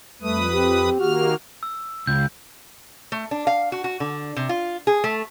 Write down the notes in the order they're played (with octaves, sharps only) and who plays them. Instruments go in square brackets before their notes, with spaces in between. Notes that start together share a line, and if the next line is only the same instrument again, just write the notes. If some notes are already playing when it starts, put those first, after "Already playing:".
[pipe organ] F2 B4 D#6 [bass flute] G3 [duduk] A3
[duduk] C4 [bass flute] G4
[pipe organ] D#3 A#3 F6 [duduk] F#4
[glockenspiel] E6
[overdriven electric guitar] C#2 [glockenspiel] G6
[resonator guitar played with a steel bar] A3
D4
F5
F#4
F#4
D3
C3
F4
G#4
A3